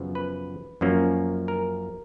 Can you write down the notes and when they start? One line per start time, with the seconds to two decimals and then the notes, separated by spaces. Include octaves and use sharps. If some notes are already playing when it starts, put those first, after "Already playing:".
Already playing: F#2 C#3 F3 B3
0.15 B4
0.81 F#2 F3 A#3 C#4
1.48 A#4